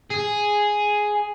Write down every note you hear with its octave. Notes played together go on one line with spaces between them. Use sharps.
G#4